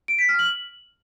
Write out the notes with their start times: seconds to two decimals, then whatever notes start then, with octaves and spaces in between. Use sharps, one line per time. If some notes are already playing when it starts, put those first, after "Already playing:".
0.08 D7
0.19 B6
0.29 F6
0.39 F#7